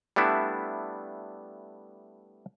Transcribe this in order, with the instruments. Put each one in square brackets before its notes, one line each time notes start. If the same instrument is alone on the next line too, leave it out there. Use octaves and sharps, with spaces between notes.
[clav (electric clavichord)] G3 A3 B3 D4 E4